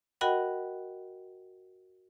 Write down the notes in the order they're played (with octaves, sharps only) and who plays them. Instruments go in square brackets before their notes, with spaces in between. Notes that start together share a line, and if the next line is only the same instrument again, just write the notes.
[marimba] F#4 A#4 D#5 F#5 G5 B5